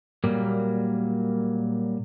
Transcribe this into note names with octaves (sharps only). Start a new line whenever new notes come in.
A#2 F#3 G3 A#3